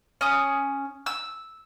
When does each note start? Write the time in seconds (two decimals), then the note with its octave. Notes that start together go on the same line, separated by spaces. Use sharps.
0.21 C#4 D#6
1.06 E6